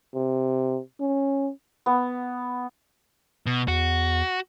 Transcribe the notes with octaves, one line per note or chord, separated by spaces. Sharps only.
C3
C#4
B3
B2
E2 F#4